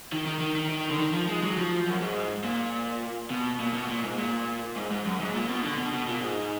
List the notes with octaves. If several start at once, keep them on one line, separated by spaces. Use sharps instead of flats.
D#3
D#3
D#3
D#3
D#3
D3
D#3
F3
G#3
F#3
F3
F#2
G#2
A#2
B2
A#2
B2
A#2
G#2
A#2
G#2
G#2
F#2
G#2
A#2
B2
D3
B2
B2
A#2
G#2